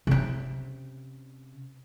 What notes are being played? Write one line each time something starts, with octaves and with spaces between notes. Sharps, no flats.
C3 C#4